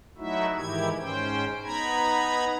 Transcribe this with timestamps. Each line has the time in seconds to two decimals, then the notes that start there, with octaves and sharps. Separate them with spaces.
0.18 F#3 A3 D#4 E4 F#4 E5
0.57 G#2 D#3 E3 E4 G4 G#6
0.98 G#2 C#4 C5 G5
1.64 B3 D#4 A#5 B5 G#6